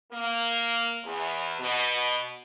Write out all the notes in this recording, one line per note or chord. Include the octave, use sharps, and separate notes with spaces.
A#3
E2
B2